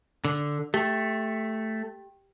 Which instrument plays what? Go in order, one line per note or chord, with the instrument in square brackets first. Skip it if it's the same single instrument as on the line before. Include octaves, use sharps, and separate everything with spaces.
[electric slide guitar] D3
[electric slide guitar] A3 [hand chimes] G4